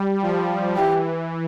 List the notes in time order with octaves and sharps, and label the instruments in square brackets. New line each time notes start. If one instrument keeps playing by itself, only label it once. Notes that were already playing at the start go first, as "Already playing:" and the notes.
Already playing: [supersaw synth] G3
F3
[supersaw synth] E3 [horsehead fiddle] G4